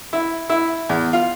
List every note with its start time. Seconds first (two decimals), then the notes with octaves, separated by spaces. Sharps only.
0.13 E4
0.50 E4
0.89 E2
1.13 F4